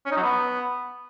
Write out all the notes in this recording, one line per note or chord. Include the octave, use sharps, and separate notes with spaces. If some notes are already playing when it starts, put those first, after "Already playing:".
C#4
D#4
F#3
B3